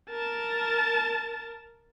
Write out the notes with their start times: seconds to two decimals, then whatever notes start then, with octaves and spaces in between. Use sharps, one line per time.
0.11 A#4 A5